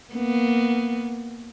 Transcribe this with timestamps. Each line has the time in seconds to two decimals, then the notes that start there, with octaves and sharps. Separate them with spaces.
0.14 A#3 B3